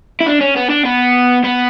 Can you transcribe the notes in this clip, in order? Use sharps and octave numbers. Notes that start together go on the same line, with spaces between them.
E4
D4
C#4
B3
D4
B3
B3